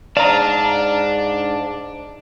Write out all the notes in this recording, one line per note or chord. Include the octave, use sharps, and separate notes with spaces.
G#2 D4 D5 F5 A5 A#5